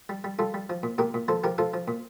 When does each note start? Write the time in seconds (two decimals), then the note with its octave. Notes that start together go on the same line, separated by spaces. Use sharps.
0.09 G3
0.24 G3
0.39 G3 F4 A4
0.54 G3
0.70 F3
0.83 A#2
0.98 A#2 G4 A#4
1.14 A#2
1.28 F3 A4 C5
1.44 F3 G4 A#4
1.58 F3 F4 A4
1.74 F3
1.88 A#2